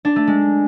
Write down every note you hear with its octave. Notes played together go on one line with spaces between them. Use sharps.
D4
A3
G#3